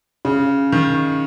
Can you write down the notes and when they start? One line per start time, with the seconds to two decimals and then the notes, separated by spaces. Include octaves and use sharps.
0.25 C#3
0.72 D#3